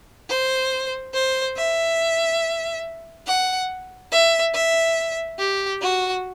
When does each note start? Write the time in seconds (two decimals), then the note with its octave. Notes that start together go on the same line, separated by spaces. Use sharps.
0.29 C5
1.14 C5
1.57 E5
3.26 F#5
4.11 E5
4.54 E5
5.39 G4
5.82 F#4